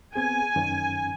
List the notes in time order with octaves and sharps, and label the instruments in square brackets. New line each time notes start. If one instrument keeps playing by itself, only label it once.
[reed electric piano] B3 C4 G#4 [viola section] G#5
[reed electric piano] F#2 D#3 C#4